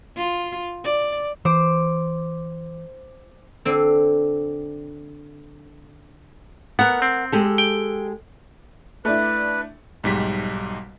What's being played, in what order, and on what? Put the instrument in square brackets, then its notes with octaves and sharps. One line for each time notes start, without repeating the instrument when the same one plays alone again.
[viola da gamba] F4
D5
[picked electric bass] E3 [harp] C5 D6
[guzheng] D3 C4
[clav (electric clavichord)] B3 [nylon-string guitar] A#4 F#5
[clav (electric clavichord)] C4
[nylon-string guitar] G#3 G4 A4
[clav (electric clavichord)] G5
[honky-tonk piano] A3 D4 E4 [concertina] B4
[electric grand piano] B1 G#2 G3 B6